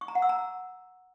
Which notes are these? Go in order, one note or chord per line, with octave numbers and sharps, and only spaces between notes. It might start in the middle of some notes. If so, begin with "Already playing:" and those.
C#6
A#5
F#5
E6
A#5